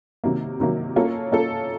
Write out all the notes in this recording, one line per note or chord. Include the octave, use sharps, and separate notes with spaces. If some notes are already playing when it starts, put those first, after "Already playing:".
C3 D#3 F#3 A#3
C3 D#3 F#3 A#3
A#3 C#4 F4 A4
A#3 C#4 F4 A4